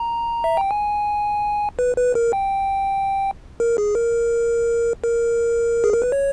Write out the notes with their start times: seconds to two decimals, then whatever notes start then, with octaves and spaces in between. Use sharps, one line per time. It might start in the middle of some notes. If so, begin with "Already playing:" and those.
Already playing: A#5
0.44 E5
0.57 G5
0.71 G#5
1.79 B4
1.97 B4
2.15 A#4
2.33 G5
3.60 A#4
3.78 G#4
3.95 A#4
5.04 A#4
5.84 G#4
5.93 A#4
6.02 B4
6.12 C#5